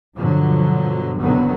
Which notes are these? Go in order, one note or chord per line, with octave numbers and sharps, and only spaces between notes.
G2 B2 D3 F3 F#3
F#1 B2 D3 D#3 F#3 B3